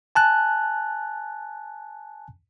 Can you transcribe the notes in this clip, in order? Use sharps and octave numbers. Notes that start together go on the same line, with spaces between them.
G#5 A5 F#6